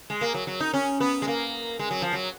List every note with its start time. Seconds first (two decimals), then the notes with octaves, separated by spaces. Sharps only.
0.10 G#3
0.21 A#3
0.35 F#3
0.47 F#3
0.60 D#4
0.74 C#4
1.00 B3
1.22 G#3
1.28 A#3
1.79 G#3
1.91 F#3
2.02 F3
2.13 F#3